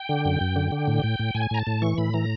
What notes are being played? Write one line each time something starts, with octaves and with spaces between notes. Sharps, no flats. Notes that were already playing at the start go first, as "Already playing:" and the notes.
Already playing: G5
D3
F#2
F#2
D3
D3
A2
A2
A2
A2 G#5
A2 A#5
A5
A2
E3 C#6
A2 B5
E3 A#5